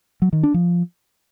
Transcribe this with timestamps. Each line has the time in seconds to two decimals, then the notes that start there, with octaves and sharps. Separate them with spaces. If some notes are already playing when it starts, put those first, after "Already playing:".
0.22 F#3
0.33 D#3
0.43 D4
0.54 F3